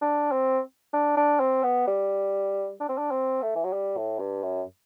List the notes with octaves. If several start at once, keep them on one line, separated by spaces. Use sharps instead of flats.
D4
C4
D4
D4
C4
B3
G3
D4
C4
D4
C4
A3
E3
F#3
G3
A2
G2
F#2